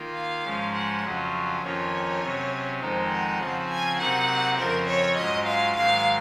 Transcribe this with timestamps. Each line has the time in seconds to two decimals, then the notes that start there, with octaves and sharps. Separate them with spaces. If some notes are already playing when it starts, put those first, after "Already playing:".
Already playing: D#3 A#3 F4
0.15 F5
0.45 G#2 F3 G#3 C#4
0.74 F#5
1.03 F2 C#3 F#3 C#4 F4
1.62 F2 D#3 A#3 C#4 F4 C#5
2.22 C3 F#3 C#4
2.81 F2 D#3 G#3 D#4 C5
3.10 F#5
3.39 C#3 F3 C4
3.69 G#5
3.99 C3 F#3 A#3 D#4 F#5
4.57 F2 C#3 F3 C4 A#4
4.87 C#5
5.16 G#2 F#3 C#4 F4 D#5
5.46 F5
5.76 G#2 D#3 F#3 A#3 F5